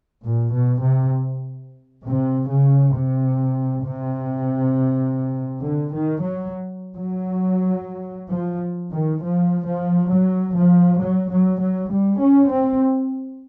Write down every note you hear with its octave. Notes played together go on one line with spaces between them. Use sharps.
A#2
B2
C3
C3
C#3
C3
C3
D3
D#3
F#3
F#3
F3
D#3
F3
F3
F#3
F3
F#3
F#3
F#3
G3
C#4
C4